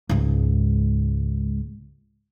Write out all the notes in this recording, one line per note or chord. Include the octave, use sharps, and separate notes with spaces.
C#2 G#2